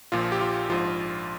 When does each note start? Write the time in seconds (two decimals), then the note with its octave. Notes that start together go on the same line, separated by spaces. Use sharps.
0.12 A#1 A#2 F3 F4
0.32 G4
0.41 F4
0.70 A#1 G#2 F3 F4